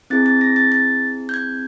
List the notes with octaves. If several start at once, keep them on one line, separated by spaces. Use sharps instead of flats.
C4 E4 G#4 A6
A6
A#6
A6
A6
G6
G#6